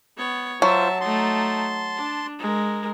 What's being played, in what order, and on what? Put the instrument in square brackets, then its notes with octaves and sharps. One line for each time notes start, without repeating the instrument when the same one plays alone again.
[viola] B3 C#5
[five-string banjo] F#3 [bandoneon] F4 C5 [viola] E5 A5
[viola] A3 D#4 [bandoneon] A5 C6
[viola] D4
G#3 A#4